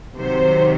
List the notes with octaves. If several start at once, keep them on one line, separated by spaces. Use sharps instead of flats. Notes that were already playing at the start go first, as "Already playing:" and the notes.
C3 D#3 F#3 C5